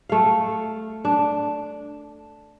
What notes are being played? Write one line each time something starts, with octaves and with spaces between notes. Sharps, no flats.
A3 F5
D4